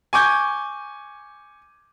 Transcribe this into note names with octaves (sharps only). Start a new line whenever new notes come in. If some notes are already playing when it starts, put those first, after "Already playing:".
G#5 C#6 D6 G6 G#6